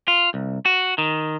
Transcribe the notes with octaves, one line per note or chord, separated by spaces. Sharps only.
F4
C2
F#4
D#3